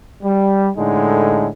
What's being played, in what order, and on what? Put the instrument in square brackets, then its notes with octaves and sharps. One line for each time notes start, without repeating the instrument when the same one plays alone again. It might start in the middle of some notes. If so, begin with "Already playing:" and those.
[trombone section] G3
A2 D3 G#3 D#4